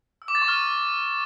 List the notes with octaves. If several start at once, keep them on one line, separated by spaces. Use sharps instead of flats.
E6
D6
A6
C#6
F6